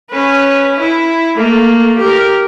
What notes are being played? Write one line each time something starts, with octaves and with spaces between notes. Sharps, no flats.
C#4 B4
E4
A3 A#3
G4 A#4